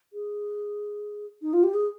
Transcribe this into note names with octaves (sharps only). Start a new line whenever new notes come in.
G#4
D#4
F4
G4
G#4